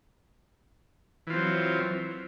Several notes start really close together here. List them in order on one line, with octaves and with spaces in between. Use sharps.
E3 F4 C4 F#3